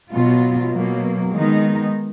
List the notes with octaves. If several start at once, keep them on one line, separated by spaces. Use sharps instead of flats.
B2 F#3 B3 F4
B2 F#3 A#3
D#3 G#3 B3 D#4